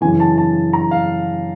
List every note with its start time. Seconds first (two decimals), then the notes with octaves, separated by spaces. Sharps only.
0.01 F#2 C#3 E3 G#5
0.20 A5
0.38 A5
0.73 A#5
0.91 F5